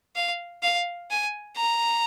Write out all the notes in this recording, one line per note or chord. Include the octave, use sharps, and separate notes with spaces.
F5
F5
G#5
A#5